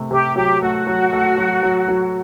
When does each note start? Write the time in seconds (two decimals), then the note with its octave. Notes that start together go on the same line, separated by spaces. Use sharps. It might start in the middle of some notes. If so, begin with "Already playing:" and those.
Already playing: C3 A3
0.11 C3 G4
0.36 F#3 G4
0.61 A3 F#4
0.87 F#3
1.12 A3
1.38 F#3
1.63 F#3
1.88 F#3